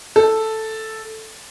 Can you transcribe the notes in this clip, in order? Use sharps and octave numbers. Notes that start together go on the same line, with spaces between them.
A4